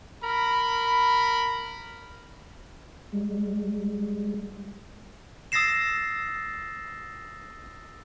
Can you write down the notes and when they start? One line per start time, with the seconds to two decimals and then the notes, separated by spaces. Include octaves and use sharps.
0.23 A#4 B5
3.12 G3 G#3
5.52 D#6 E6 A6 A#6 C7 E7